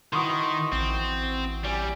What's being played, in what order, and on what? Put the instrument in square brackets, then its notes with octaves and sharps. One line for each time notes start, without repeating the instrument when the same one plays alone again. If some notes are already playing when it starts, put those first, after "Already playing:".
[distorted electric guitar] D#3 [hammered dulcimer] E4 F#4 B4 [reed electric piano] C6 C#6 D#6
[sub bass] A1 [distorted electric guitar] C4
[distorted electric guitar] G3 [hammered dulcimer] D5 G#5 D6